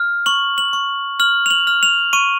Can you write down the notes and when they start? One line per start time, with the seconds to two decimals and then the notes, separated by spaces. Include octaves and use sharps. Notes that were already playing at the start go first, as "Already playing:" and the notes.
Already playing: F6
0.26 C#6 F#7
0.58 F#7
0.73 C#6
1.20 F6 F#7
1.46 F7
1.50 F#7
1.67 F6
1.83 F7
2.13 C#6 D#7